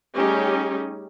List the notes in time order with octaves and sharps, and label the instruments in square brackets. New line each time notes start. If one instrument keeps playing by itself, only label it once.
[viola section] G3 A3 C#4 D#4 G4 G#4